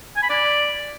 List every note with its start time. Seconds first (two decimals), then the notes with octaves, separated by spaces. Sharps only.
0.16 G#5
0.23 B5
0.29 D5